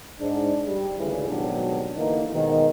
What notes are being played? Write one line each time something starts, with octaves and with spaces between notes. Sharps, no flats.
G#2 D4
G3
G#1 D2 C#3 E3
G#1 B2 F#3 G3 D4
D3 E3 A#3 B3 D#4
G#2 B2 D#3